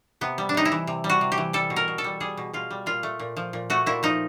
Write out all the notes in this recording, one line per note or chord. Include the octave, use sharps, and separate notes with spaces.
C3 B3
G3
D4
C3 D#4
E4
E3
C3
G3
F#4
C3
G4
E3
G3 A4
B2
A#4
B2
A4
G3
G3 G#4
B2
B2 F4
G3
A#2 F4
A3
A#2
F3
A#2
A3 F#4
A#2 E4
F3 D#4